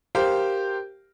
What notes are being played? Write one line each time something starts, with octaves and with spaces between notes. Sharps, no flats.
G4 A#4 C5 F5 G5